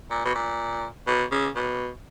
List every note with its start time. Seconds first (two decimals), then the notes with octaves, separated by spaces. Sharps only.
0.10 A#2
0.25 B2
0.35 A#2
1.07 B2
1.32 C#3
1.56 B2